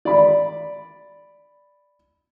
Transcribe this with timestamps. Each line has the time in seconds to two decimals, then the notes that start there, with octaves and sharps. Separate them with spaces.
0.05 D5 B5